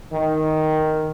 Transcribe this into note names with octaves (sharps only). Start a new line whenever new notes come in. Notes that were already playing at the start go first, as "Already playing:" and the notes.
D#3